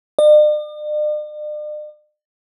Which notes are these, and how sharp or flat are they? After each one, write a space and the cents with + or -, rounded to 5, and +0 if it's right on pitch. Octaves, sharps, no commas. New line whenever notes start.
D5 +45